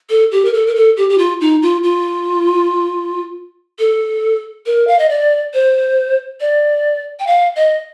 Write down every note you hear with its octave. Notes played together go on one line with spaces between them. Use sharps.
A4
G4
A#4
A4
A#4
A4
G4
G4
F4
D#4
F4
F4
A4
A#4
F5
D#5
D5
C5
D5
G5
F5
D#5